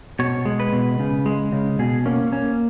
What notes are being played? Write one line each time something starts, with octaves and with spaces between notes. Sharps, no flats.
B2 C#5
G#3
B4
B2
C#3
G#3
C#3
B2 G#4
A#3 C#4
A#3 C#4